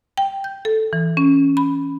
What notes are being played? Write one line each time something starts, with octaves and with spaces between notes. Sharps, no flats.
G5
G6
A4
E3
C#4
B5